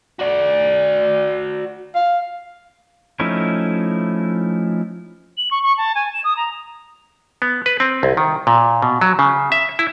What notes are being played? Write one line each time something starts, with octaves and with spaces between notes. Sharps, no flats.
F#4 D5
F5
F3 A3 C#4 D#4 E4
F#7
C#6
C#6
A5
G#5
E7
D#6
A#5
B3
B4
C4
C2
D#3
A#2
B2
F#3
C#3
E5
E4